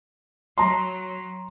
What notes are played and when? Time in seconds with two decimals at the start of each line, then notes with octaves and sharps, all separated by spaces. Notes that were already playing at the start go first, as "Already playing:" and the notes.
0.58 F#3 A#5 C6